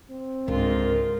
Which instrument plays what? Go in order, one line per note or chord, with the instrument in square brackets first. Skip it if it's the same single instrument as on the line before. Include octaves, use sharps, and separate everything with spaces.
[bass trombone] C4
[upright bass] C#2 D3 [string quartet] G#2 F4 [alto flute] A#4